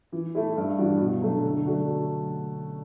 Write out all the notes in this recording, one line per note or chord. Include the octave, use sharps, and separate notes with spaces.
E3
A3 E4
G2
E3 G3 D4 F#4
B2
F#3 A3 D4
D3
F#3 A3 D4 F#4